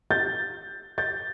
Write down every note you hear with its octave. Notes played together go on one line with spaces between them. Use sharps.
G6 A6
G6 A6